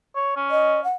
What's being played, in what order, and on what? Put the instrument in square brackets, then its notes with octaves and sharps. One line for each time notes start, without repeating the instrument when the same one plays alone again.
[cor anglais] C#5
C#4
[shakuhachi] D#5
F#5